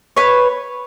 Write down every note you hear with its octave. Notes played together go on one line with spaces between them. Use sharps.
B4 C#5